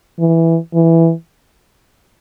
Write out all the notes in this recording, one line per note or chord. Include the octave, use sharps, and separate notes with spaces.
E3
E3